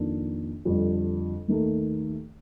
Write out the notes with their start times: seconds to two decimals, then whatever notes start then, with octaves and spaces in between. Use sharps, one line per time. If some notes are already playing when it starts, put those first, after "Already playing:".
Already playing: F2 D#3 A#3 D4
0.65 F2 D3 G3 D4
1.48 D#2 D#3 A3